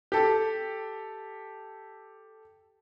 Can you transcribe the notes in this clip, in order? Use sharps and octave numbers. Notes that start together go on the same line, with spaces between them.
G4 A4